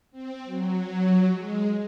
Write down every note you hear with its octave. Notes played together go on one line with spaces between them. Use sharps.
C4
F#3
G#3